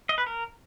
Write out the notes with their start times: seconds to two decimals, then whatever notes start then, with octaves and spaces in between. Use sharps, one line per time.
0.09 D#5
0.18 B4
0.26 A#4